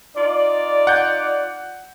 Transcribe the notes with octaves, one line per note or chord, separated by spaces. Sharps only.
D#4 F4 D5
F#5 G6